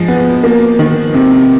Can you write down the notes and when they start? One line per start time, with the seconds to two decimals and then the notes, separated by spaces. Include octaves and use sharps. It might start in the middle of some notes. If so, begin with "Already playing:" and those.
Already playing: F3 G#3
0.08 B3
0.44 A#3
0.79 D#3
1.14 C3